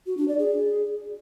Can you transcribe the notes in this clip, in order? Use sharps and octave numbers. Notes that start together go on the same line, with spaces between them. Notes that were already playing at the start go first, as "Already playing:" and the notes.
F#4
D4
D5
G#4